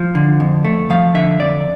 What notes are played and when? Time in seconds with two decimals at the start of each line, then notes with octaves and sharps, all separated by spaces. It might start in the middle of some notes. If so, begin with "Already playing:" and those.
Already playing: F3
0.15 D3
0.40 F2
0.65 A3
0.90 F3 F5
1.14 D3 E5
1.40 F2 D5